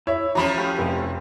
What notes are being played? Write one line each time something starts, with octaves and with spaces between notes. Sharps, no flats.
E4 C#5 E5
E3 F3 C#4 F#4 A#5 B5
A3 G4 F5
F1